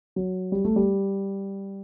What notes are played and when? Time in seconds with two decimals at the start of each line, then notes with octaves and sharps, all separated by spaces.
0.16 F#3
0.52 G3
0.65 A3
0.76 G3